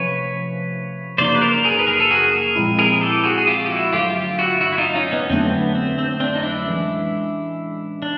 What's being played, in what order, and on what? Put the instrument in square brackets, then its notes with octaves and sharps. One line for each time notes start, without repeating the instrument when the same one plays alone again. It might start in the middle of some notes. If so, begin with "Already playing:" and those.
Already playing: [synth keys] C3 F3 A3 C#4 [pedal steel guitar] B4 C#5
[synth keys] F#2 C#3 F3 A#3 D#4 [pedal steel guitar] C5 D5
[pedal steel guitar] B4
A#4 C5
G#4 A#4
B4
G#4 A#4
A4
F#4 G#4
G#4 A#4
[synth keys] A#2 F3 G#3 C4 E4
[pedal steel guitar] G#4 A#4
G#4
G4 A4
F#4 G#4
G#4
F4 G4
G4
E4 F#4
[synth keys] G2 D3 F#3 A3 [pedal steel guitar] F4 G4
[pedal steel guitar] F4 G4
E4 F#4
E4 F#4
E4
D#4 F4
C#4 D#4
B3 C#4
[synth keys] F2 D3 F#3 A3 D4 [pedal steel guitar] C4
[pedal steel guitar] B3
C4
C4
C4 D4
D#4
D4 E4
[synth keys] A2 E3 G#3 C#4
[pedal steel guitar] D4